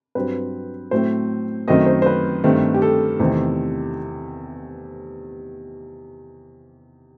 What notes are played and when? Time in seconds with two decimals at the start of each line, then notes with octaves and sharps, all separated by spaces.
0.15 G2 F#3 C4 B4
0.91 A2 F#3 A3 C4 C5
1.68 F#2 D#3 F#3 A3 C4 D#5
1.86 C5
2.02 C5
2.06 B4
2.44 G2 D#3 A3 C4
2.74 G4
2.82 A4
3.20 E2 C3 D#3 A3 C4